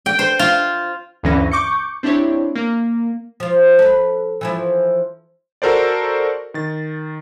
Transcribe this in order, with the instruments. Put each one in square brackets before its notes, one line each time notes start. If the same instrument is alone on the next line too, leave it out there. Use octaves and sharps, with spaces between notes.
[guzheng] G5
C5
F4
[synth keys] D2 G2 E3 C#4 A#6
C#6 D6 G6 C#7
C4 D4 E4 G4 C#5
A#3
[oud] F3 F4
A4 B4
E3 F3 E4
[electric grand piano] F#4 A4 A#4 C5 D5
D#3 A6